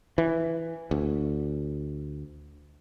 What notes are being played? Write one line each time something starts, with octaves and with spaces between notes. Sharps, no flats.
E3
D2